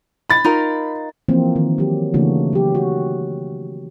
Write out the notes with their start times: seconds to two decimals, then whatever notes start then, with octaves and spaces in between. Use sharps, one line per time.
0.30 B5 A6
0.44 D#4 F4 A#4
1.28 E3 F3 A#3 C4
1.56 D#3
1.78 F#3 G4
2.14 C#3 E3 A3 A#3 D4 F#4
2.53 F#3 G4
2.75 F#4